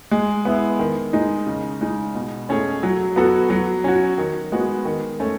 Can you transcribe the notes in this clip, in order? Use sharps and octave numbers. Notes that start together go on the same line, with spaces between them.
G#3
B3 E4
D#3
G#3 D#4
C#3
G#3 D#4
B2
A3 C#4 G#4
F#3
B3 F#4 A4
F#3
C#4 F#4
D#3
G#3 B3 F#4
D#3
A3 C#4